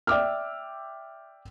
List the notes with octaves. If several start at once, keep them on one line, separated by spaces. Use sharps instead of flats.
D5 E5 G5 D6 E6 F6